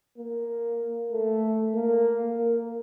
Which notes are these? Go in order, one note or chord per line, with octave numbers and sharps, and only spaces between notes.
A#3
A3
A#3
A#3